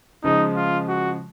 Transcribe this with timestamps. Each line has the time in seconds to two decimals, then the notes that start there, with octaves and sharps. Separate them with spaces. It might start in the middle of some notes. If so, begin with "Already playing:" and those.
0.24 C#3 F3 G#3 D#4
0.56 F4
0.88 F#4